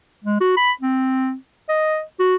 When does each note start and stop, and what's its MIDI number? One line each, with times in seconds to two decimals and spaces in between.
0.24 0.40 56
0.40 0.52 66
0.57 0.72 83
0.81 1.35 60
1.69 2.02 75
2.19 2.36 66